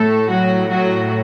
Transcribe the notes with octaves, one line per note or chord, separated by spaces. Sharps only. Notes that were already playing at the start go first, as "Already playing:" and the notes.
Already playing: A2 A3 A4
F#3 F#4
F#3 F#4